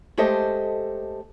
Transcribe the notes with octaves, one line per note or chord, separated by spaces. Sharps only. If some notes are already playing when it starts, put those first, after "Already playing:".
G#3 A3 G4 A4 C5 D#5